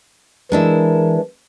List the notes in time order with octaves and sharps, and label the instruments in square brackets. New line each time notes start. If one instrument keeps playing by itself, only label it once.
[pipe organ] E3 [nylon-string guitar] G#3 D4 E4 [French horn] A#4